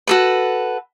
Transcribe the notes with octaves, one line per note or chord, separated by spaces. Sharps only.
F#4 A4 B4